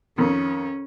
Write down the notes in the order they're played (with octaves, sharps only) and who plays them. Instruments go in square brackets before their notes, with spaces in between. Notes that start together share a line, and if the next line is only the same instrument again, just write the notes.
[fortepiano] F2 D#3 [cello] C#4